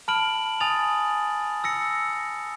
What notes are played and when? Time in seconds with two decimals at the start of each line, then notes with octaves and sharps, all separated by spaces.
0.08 A5 B5 F6 D7 F#7
0.60 G#5 D#6 A6 F7
1.64 E6 A#6 C#7